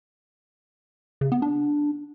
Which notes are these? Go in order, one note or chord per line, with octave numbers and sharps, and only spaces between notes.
C#3
B3
D4